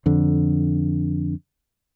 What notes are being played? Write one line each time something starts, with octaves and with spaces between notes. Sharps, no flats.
F2 D3